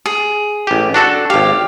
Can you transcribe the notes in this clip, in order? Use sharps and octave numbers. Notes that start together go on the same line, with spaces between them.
G#4
A1 G4
D4 F#4 A4
G#1 G4 F5